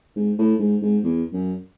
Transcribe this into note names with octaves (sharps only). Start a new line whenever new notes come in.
G#2
A2
G#2
G#2
E2
F#2